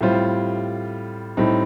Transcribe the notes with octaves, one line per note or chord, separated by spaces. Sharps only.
A2 G3 C4 F4 C5
A2 G3 C4 D#4